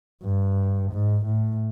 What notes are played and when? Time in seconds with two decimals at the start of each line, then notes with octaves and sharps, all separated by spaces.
0.24 G2
0.92 G#2
1.26 A2